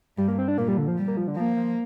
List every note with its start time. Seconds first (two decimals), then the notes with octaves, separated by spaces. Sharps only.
0.18 G2 G3
0.28 A#3
0.38 C4
0.48 D4
0.58 A#2 A#3
0.68 G3
0.77 D3
0.88 F3
0.98 G3
1.07 A#3
1.17 F3
1.28 D3
1.36 F3 A#3
1.57 F3